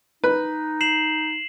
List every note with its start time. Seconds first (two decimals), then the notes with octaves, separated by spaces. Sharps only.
0.24 D#4 B4
0.81 C7 E7 F#7